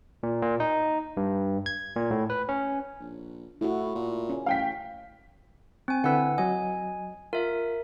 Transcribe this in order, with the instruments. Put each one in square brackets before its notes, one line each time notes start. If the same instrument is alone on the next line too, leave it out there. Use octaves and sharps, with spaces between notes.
[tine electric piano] A#2
A#2
D#4
G2
G#6
A#2
A2
B4
C#4
[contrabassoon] A#1
[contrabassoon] A2 [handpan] E4 F#4
[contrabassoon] A#2
[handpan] C#4
[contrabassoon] A1 [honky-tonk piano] F5 G5 B6
[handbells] C4 G#5
[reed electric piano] D3 E4 B4 [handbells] F#5 E6
[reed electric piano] F#3 D#5 [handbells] G#5
[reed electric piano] F4 [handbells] A#4 E5